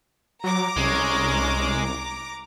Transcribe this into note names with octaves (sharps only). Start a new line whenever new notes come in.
F#3 A#5 D6
C2 G#3 C#4